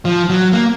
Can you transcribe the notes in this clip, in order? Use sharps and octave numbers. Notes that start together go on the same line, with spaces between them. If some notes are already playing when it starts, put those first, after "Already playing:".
F3
F#3
A#3